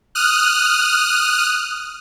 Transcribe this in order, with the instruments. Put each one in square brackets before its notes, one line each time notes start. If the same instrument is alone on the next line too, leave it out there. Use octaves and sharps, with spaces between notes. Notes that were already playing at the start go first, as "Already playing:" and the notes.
[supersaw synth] D#6 F6 F#6